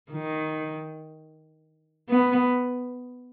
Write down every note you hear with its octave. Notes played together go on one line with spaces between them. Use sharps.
D#3
B3